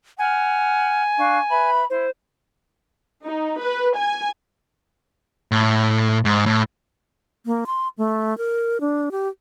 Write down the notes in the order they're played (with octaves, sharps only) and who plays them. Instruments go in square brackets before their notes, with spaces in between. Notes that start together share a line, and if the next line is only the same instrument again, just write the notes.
[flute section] F#5 F6 [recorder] G#5
[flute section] D4 F5 C#6
B4 E5 B5
[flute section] E4 [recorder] C5
[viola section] D#4
B4
G#5
[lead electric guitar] A2
G#2
A2
[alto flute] A#3
C6
A3
A#4
D4
G4